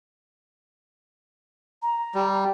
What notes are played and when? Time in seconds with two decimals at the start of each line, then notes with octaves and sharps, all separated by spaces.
1.82 A#5
2.14 G3